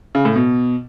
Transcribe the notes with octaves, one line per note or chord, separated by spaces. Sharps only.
C#3
A2
B2